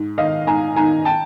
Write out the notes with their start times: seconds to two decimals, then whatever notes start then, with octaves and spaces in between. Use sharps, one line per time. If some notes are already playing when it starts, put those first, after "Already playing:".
Already playing: G#2
0.18 D#3 D#5 F5
0.47 G#2 G#5 A#5
0.76 D#3 G#5 A#5
1.05 G5 A5